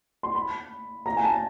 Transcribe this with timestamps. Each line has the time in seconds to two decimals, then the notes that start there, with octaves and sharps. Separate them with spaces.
0.23 C6
0.35 B5
1.06 A#5
1.17 G#5
1.24 A5